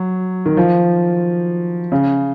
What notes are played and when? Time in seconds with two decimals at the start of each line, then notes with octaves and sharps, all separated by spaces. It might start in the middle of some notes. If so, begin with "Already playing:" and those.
Already playing: F#3
0.46 D#3
0.57 F3
1.92 C#3